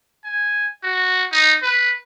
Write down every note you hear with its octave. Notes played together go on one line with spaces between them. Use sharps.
G#5
F#4
D#4
B4